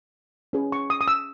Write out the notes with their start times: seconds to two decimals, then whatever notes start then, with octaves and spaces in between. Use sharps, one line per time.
0.53 C#4 G#4 B4
0.72 C#6
0.90 D#6
1.01 D#6
1.08 E6